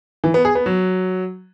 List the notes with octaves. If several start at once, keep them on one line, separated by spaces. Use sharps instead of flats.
E3
B3
G#4
B3
F#3